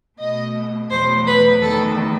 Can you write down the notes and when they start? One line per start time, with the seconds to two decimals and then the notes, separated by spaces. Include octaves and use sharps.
0.19 B2 A3 D#5
0.90 E2 B2 F#3 A3 C5
1.26 B4
1.62 E2 D#3 A3 A4